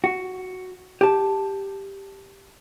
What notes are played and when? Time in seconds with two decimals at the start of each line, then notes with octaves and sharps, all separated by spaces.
0.04 F#4
1.01 G4 A5